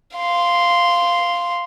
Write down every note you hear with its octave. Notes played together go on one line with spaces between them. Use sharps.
F5 C6